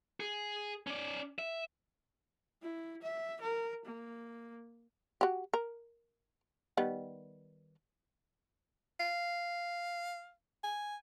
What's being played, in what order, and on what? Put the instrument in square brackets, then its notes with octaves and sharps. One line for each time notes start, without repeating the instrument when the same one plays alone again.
[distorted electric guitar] G#4
C#4 D5
E5
[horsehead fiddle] E4
E5
A#4
A#3
[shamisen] F#4 G4
A#4
D#3 G3 B3
[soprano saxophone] F5
G#5